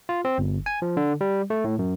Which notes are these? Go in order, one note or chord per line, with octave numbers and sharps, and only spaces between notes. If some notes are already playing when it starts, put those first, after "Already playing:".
F4
C4
G1
G#5
F3
D3
G3
A3
A2
F#2